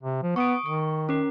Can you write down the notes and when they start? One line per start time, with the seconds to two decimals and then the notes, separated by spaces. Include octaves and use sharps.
0.03 C3
0.23 F3
0.36 B3 C#6 D#6 D7
0.66 D#3 C#6
1.09 C#4 A#4